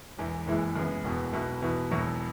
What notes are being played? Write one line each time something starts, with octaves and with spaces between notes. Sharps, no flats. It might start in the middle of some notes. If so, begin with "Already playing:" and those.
E1 E2 E3
F#1 E2 E3 G#3 E4
F#2 C#3 E3 G#3 B3
E1 E2 B2 B3
B1 B2 B3 E4
E2 B2 B3 E4
E1 E2 B2 F#3 E4